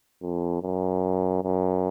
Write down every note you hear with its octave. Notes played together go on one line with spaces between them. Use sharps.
F2
F#2
F#2